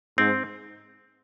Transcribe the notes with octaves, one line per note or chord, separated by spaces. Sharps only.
G#2 C4